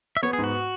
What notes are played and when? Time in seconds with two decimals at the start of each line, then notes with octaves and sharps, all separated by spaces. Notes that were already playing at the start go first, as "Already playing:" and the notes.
0.17 E5
0.23 B3 C#5
0.33 G#4
0.38 G#2
0.44 F#4